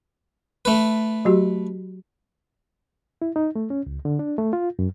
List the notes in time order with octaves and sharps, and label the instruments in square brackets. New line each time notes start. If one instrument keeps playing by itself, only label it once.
[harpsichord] A3 B4
[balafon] F#3 F#4 G4
[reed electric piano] E4
D#4
A3
C#4
C#2
D3
D4
A3
F4
F#2